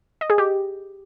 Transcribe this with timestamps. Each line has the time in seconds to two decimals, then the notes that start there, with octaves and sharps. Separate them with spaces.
0.21 D#5
0.30 G#4
0.38 G4